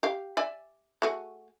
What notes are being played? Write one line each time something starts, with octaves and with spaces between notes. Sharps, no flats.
G4 F5
D5 E5 G#5
A3 F#4 G#4